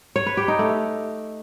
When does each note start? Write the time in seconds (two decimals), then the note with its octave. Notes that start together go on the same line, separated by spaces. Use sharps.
0.16 C#5
0.26 B4
0.37 G4
0.48 D#4
0.59 A3